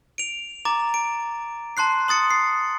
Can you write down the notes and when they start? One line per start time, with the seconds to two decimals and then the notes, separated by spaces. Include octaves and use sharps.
0.18 D7 F7
0.65 A#5 D6 A6
0.94 D7
1.77 A5 C6 F#6 C7
2.08 C6 D#6 A6 C#7
2.30 C7